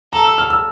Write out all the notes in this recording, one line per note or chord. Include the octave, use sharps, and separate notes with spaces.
A4 A#5
E6
F6
E6